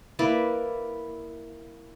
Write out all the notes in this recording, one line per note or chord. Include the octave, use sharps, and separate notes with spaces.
A#3 E4 B4 D5